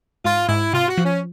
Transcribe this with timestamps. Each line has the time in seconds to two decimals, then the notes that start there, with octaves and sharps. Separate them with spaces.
0.25 G#2 F4
0.48 G#2 E4
0.73 C3 F4
0.89 F#4
0.97 F3
1.04 C#4